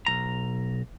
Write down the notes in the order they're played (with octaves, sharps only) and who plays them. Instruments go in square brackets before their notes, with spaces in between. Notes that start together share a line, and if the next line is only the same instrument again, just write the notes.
[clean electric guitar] B1 G2 A#5